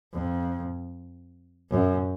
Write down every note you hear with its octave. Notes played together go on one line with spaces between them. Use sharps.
F2
F#2